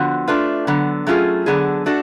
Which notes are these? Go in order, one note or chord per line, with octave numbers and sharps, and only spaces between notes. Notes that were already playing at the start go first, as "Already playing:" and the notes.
Already playing: D3 F3 B3 F#4
A3 D4 F4 B4
D3 F#3 B3
F#3 A3 C#4 F4 G#4
D3 F#3 B3 D4 G#4
A3 D4 F#4 A4